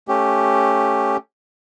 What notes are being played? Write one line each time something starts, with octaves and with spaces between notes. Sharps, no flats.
A3 C#4 G4